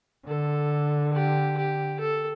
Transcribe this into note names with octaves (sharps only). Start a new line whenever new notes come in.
D3 A4
G4
G4
A4